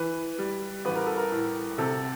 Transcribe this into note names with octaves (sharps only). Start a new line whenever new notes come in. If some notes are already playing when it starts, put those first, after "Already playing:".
Already playing: E3 B4
G3
A1 B4
A#4
A4
A#4
A2
C3 A4